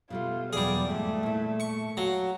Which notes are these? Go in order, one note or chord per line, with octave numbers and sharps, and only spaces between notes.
B2 G3 A3 F4
E2 B2 F#3 G3 G#4 D5
G#2 A3
A#2 E4
C#6
F#3 F5 F#5